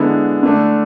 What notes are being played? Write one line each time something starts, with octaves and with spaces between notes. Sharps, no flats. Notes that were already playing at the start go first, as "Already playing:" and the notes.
Already playing: D3 G#3 B3 E4
D3 A3 D4